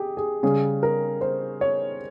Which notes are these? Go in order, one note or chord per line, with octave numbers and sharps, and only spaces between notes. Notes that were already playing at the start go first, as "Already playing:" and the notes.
Already playing: G4 G#4
G#4
C#3 G3 C#4 G#4
A#4
C5
C#5